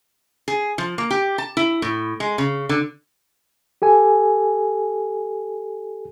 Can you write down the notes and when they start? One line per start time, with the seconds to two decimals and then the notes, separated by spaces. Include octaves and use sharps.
0.48 G#4
0.78 F3
0.98 A#3
1.11 G4
1.38 A5
1.57 E4
1.82 A2
2.20 G#3
2.38 C#3
2.69 D3
3.82 G4 A4 G#5